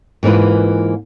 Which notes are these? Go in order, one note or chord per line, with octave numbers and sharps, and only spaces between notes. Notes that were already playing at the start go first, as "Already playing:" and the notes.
G#2 E3 A#3 F4 B4